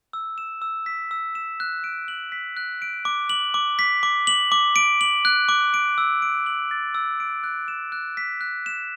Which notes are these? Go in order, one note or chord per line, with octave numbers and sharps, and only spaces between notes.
E6
E7
E6
B6
E6
E7
F#6
D7
F#7
B6
F#6
D7
D6
F#7
D6
B6
D6
F#7
D6
D7
F#7
F#6
D6
D7
E6
D7
F#7
A6
E6
D7
F#6
E7
F#6
B6
F#6
E7